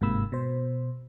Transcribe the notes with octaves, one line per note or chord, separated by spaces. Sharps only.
G1 G#2 C3 A#3 B5 E6
B2 C5